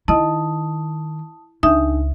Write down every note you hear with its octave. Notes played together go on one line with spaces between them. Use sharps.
D#3 E4 D#5 A5 D#6
C#2 D4 D#4 E5 D#6